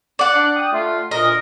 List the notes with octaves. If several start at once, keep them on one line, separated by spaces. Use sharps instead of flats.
D5 F#5
D4
G5 D#6
A3 F4
D2 A#2 A#4 D#5